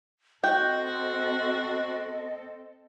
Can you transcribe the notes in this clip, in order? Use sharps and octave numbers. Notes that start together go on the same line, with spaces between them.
C4 F#4 A4 D#5 G5